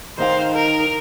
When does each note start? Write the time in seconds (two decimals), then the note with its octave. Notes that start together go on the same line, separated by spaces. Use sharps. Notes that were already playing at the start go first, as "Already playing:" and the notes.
0.18 D#3 D#4 C5 F5 G5
0.54 A#4